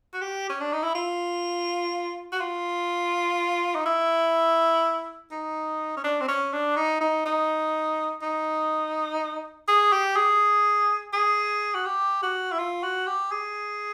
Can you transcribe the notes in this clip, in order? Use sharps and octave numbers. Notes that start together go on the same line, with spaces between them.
F#4
G4
C#4
D4
D#4
E4
F4
F#4
F4
D#4
E4
D#4
C#4
D4
C4
C#4
D4
D#4
D#4
D#4
D#4
G#4
G4
G#4
G#4
F#4
G4
F#4
E4
F4
F#4
G4
G#4